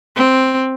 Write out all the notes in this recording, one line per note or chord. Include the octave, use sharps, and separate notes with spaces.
C4